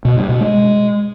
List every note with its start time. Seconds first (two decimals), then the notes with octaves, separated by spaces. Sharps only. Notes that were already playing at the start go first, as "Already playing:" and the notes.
0.05 B2
0.17 G2
0.29 B2
0.41 G#3